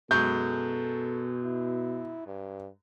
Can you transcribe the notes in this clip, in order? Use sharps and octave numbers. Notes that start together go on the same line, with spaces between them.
F#2 B2 G#3 A4 C#6 G6
E4
G2